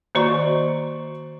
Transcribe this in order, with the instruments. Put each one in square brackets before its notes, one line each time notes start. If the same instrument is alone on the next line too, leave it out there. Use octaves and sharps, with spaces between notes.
[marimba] D#3 A#3 F#4 [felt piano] C5 D5 C#6